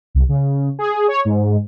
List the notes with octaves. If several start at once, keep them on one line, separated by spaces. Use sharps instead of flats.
C2
C#3
G#4
C#5
G#2